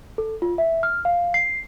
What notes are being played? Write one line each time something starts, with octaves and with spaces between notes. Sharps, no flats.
A4
F4
E5
F6
F5
C7